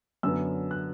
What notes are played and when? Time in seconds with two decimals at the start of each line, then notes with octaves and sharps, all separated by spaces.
0.23 F#2 D3 F#3 B3 E6
0.71 F#6